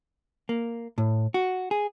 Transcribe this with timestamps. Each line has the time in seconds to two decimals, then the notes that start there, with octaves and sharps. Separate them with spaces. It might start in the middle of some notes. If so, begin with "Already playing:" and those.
0.49 A#3
0.98 A2
1.34 F#4
1.71 G#4